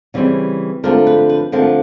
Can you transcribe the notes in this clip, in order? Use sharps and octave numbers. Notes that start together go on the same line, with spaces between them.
C#3 E3 G3 C4
D3 F3 A3 C4 A#4
B4
B4
D3 F3 A3 C4 A#4